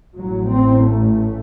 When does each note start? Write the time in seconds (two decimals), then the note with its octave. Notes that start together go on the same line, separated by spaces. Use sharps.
0.15 A1 A2 F#3
0.49 C4
0.84 A3